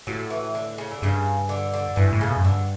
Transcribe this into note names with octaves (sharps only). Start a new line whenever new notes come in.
A2 F#3
E3
D3
C#3
D3
G2 C#3
D3
D3
G2 E3
A2
C#3
B2
F#2
G2 D3